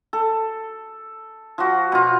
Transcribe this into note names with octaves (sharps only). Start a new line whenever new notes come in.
A4
F3 F#4
B2 F4